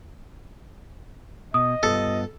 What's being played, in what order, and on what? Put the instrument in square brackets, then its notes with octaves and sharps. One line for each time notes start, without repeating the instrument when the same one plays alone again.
[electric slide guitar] B2 [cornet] D#5 [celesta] D#6
[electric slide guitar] G2 B3 F4 [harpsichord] A4